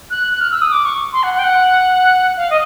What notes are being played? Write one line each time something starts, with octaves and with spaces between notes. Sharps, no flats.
F#6
F#6
F6
E6
D#6
D6
C#6
C6
F#5
F#5
G5
F#5
F5
D#5